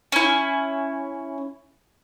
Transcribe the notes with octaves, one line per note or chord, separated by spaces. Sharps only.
C#4 E4